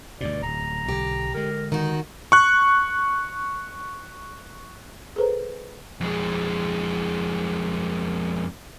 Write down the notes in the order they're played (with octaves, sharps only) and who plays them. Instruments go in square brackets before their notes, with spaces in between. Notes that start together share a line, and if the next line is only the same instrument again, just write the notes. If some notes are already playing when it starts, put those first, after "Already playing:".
[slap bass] D2 G2 B2 [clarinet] D5
[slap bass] D1 [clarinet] A#5
[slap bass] B1 D3 [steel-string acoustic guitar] G4
[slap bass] D3 G#3 [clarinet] A#4
[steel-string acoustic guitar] D#3 F#4 [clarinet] D#4
[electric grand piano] C#6 F#6
[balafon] G#4 A4 B4 C5 A#5
[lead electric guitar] F2 G#3